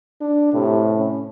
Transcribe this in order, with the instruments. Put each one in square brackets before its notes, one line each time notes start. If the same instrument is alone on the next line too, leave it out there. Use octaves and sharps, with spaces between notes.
[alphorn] D4
[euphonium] A2 [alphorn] C3
[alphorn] C#4